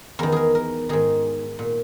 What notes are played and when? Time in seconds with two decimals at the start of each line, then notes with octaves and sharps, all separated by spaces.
0.19 E2 D#3 A#4
0.32 G#4 A#4
0.55 A#4
0.89 G#2 D#3 G#4
1.59 A#2